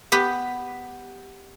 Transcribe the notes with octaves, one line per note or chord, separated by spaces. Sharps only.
B3 G4 B4